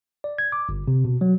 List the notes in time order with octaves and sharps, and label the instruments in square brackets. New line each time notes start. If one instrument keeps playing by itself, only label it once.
[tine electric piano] D5
G#6
D6
G1
C3
B2
F#3